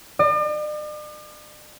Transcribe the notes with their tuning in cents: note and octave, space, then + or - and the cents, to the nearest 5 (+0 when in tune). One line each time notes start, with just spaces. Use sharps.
D5 +45